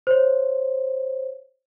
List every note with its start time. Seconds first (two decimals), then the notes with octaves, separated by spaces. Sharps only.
0.07 C5 C#5